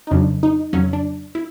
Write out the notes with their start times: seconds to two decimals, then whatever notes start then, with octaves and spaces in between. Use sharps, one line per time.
0.07 D#4
0.11 F2 C#3 F#3 D4
0.43 D#4
0.73 F2 C#3 F#3 C#4
0.93 D4
1.35 E4